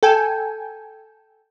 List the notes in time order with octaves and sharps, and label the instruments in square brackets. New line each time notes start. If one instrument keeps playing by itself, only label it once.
[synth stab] A4 G5 G#5